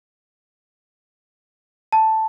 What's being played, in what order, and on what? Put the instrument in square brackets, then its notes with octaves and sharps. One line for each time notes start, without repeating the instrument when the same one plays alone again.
[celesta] A5